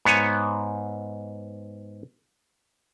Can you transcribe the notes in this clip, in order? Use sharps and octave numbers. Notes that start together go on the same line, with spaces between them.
G#2 B3 C#5 G#5